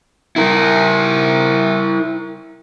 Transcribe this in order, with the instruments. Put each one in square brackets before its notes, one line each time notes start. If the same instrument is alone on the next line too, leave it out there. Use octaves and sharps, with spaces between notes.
[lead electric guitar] E4 A#4